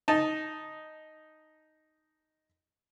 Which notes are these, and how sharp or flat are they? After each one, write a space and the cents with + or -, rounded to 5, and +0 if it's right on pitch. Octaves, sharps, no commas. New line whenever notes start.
D#4 +0 A5 +0